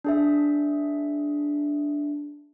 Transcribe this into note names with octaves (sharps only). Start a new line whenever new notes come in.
D4 G#4 E5